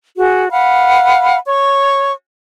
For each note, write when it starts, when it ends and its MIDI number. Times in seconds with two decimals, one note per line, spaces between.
0.17 0.49 66
0.17 0.49 68
0.51 1.38 77
0.51 1.38 78
0.51 1.38 83
1.46 2.12 73
1.46 2.12 85